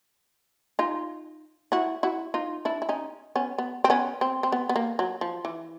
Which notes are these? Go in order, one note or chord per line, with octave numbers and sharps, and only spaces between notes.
D#4 F4
E4 F#4
E4 F#4
D#4 F4
D4 E4
E4
C#4 D#4
B3 C#4
B3
C4
B3 C#4
C4
C4
B3
B3
A#3
F#3
F3
E3